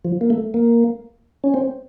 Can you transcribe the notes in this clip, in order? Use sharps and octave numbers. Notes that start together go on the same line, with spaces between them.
F3
A#3
A3
A#3
C#4
C4